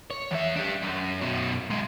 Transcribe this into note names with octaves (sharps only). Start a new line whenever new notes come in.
C#5
E2 E5
D4 G4
F#2
F#2 B2
B1 G#3